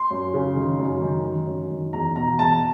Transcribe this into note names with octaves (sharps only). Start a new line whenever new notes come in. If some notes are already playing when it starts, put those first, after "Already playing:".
Already playing: C6
F#2
C#3
D#3
F#2
D#3
D#3
F#2
D#3
E2 A#5
B2 A#5
E2 A5